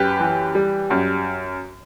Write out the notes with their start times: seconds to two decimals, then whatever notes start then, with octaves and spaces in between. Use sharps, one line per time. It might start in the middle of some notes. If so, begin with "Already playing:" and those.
Already playing: F#2 G4 B4
0.20 E3
0.55 G3
0.90 F#2